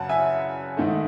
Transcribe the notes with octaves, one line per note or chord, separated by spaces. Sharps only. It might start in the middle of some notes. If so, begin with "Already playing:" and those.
Already playing: F#2 C#3 F#3 F#5 A5
E5 G#5
G#2 D#3 A3